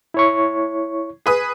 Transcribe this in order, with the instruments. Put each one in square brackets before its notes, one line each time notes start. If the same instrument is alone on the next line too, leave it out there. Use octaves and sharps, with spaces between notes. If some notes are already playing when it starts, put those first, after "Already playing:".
[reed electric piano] E4 C#5 C#6
[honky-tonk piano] G#4 B4 D#6